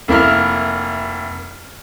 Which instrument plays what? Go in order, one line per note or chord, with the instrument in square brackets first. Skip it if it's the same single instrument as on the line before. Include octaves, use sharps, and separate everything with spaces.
[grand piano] F1 A#3 E4 A#4 F6